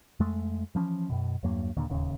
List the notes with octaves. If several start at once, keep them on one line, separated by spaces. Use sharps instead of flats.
F2 G#3 A3
E3 F3 C#4
F#2 B2
E2 G2 F#3 A#3
D#2 A#2 D3
D1 D#2 C#3